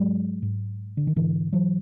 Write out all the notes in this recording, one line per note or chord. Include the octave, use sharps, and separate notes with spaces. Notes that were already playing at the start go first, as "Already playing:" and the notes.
Already playing: G#2 F#3 G#3
G#2
D3
D#3
G#2 D3 E3
E3 F#3